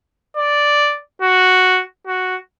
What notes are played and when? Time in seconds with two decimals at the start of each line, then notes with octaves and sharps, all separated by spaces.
0.37 D5
1.22 F#4
2.07 F#4